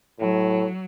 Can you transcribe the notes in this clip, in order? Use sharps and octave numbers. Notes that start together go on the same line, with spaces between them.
A2 F#3